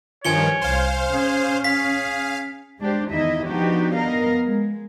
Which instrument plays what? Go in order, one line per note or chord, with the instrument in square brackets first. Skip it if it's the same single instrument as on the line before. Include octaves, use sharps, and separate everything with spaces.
[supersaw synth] G2 D#3 F3 [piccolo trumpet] C#5 [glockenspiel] G#5 C#7 G7
[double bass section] C2 [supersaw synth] C5 F5
[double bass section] C#4 [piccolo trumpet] G#4
[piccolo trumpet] G#4 [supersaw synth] F5 [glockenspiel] B6
[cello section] G#3 D4 G4 C5
E2 D#3 D#4 E4 D#5 E5
F3 B3 D4 D#4 F#4 G4
B3 A#4 D#5 F5
G#3